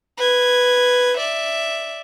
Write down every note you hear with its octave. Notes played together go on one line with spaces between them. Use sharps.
B4 G#6
D5 E5